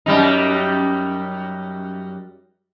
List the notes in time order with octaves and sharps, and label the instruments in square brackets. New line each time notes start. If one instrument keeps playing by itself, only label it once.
[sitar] F#2 G3 D#4